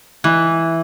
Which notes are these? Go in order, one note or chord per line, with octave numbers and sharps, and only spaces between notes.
E3